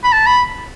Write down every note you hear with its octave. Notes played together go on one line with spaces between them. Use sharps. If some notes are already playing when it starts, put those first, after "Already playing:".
B5
A5
B5